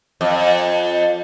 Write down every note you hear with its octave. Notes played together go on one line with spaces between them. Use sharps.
F2